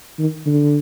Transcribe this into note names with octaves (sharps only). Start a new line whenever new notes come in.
D#3
D3